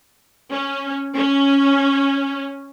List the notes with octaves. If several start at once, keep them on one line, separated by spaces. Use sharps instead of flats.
C#4
C#4